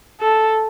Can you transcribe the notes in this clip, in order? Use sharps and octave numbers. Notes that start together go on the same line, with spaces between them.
A4